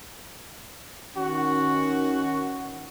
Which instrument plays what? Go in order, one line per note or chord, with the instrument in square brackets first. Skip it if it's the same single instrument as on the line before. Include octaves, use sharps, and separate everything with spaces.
[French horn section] D#3 C#4 [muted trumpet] F#4